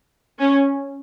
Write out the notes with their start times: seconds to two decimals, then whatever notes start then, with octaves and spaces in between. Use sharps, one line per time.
0.38 C#4